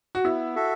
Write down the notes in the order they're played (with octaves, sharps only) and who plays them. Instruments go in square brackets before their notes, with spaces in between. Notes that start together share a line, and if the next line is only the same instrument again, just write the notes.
[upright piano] F#4
[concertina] B3 [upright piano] E4
[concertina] F#4 A4 E5